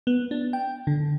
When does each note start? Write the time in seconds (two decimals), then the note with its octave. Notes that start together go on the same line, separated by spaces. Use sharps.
0.07 B3
0.31 D4
0.53 G5
0.87 D3